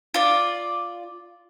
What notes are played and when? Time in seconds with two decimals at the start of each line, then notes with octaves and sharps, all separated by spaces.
0.14 F4 D5